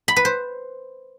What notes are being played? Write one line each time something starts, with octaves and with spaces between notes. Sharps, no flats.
B5
B4
C5